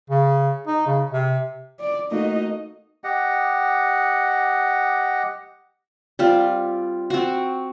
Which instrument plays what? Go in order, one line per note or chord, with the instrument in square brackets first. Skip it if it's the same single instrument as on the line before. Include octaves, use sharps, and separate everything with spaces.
[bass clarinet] C#3
D#4
C#3
C3
[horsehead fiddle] D5
[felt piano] A3 A#3 F#4 [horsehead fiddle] D#4 D#5
[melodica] G4 D#5 F#5
[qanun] G3 C4 F4
C4 F#4